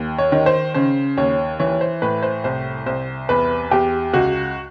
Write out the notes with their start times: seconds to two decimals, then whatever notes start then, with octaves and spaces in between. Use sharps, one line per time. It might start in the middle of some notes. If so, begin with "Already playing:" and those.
Already playing: D#2
0.18 C#5
0.32 D#3
0.46 C5
0.74 C#3 C5
1.17 D#2 C#5
1.60 E3 C#5
1.81 C5
2.02 A2 B4
2.23 C5
2.44 C2 C5
2.86 C2 C5
3.29 E2 B4
3.71 E2 G4
4.13 C#2 F#4